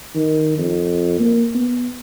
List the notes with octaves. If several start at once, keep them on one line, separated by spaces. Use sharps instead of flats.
D#3
F2
A#3
B3